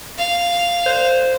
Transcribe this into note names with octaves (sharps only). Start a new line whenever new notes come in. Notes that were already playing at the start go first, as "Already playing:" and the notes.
F5
C5